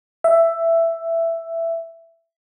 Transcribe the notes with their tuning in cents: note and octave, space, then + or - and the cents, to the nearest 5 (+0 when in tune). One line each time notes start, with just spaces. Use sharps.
E5 +10